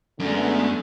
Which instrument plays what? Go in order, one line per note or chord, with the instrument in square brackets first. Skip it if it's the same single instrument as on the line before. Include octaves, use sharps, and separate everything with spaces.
[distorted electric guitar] F#2 [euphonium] D3 [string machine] G#3 A3 B3